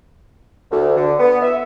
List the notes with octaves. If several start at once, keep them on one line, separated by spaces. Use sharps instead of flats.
D2
D3
B3
E5